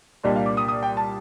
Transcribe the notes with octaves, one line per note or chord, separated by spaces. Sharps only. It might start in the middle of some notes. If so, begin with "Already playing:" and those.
C2 A#2 G3 A#3 D4 D#5
F5
D6
D#6
D#6
G5
A5